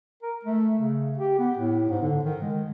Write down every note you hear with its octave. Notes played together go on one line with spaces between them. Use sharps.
A#4
A3
C#3
G4
B3
A2
G#2
D3
D#3
G#3